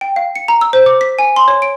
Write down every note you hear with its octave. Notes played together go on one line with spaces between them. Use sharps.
G5
F5
C#7
A#5
E6
C5
D6
B6
G#5
C6
C#5
D7